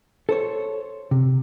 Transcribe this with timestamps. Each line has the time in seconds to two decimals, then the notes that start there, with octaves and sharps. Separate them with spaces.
0.29 A4 C5 C#5
1.11 C3